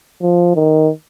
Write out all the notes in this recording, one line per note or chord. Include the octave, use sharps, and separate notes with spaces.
F3
D#3